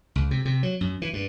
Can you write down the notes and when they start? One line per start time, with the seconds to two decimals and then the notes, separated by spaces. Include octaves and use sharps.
0.16 C#2
0.31 C3
0.45 C3
0.63 F#3
0.81 F#2
1.02 E3
1.13 G2